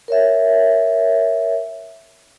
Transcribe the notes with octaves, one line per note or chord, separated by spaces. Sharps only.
A#4 C#5 E5